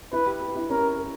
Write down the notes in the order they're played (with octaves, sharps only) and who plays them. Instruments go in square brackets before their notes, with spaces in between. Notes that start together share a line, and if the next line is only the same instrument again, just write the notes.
[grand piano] E4 [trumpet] B4
[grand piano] G4
G4
E4
[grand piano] C#4 [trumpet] A#4
[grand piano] A#4